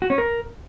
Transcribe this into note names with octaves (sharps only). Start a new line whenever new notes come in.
F#4
C#4
A#4